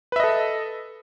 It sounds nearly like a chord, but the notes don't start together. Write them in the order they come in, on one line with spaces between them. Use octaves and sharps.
B4 E5 D#5 A4